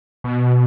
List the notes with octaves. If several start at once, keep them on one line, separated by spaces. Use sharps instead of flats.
B2